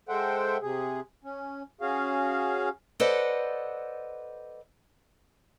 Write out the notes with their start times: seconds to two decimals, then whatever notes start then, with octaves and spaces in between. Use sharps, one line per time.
0.09 G#3 A4 C5 E5 F#5 G5
0.62 C3 G#4
1.24 C#4
1.81 C#4 F#4 G#4 F5
3.00 A4 B4 C5 D5 D#5 F#5